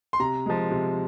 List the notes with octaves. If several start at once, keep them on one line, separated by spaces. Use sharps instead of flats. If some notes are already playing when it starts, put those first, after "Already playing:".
C6
C3 A#5
F3 G#3
C3